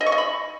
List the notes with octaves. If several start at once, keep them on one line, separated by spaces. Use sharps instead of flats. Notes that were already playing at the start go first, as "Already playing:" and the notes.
D#5
C#6
D#5
B5